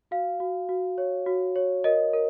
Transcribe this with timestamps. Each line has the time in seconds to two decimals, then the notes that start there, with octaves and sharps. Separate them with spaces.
0.11 F#4 F5
0.40 F#4
0.69 F#4
0.98 C#5
1.26 F#4
1.56 C#5
1.84 A#4 D#5
2.13 A#4